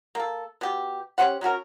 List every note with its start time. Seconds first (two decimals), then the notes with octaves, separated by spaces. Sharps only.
0.15 A#3 A4
0.61 B2 G4
1.18 C#4 G4 C5 F#5
1.41 F#3 C#4 F#4 A#4